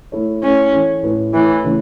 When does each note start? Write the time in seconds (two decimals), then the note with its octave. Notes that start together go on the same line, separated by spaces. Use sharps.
0.12 A3 E4 A4 C#5
0.43 A3 C#4 E4 C#5
0.73 E3 C#4 A4
1.03 A2 A3 E4 B4
1.33 E3 A3 E4 A4 C#5
1.64 C#3 E3 A3 C#4